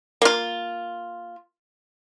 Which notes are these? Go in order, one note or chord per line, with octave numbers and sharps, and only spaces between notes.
A#3 F4